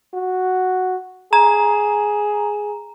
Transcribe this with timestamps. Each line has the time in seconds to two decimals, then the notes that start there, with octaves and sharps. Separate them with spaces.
0.14 F#4
1.33 G#4 A#5